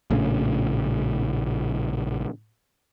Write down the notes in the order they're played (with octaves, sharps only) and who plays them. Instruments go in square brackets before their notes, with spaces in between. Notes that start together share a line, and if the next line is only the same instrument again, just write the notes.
[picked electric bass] A#1 A2 C#3